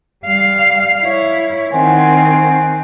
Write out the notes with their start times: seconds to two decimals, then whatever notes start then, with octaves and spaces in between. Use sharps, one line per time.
0.25 G3 F5
1.02 E4 C#5
1.72 D#3 C4 C5 F#5 G#5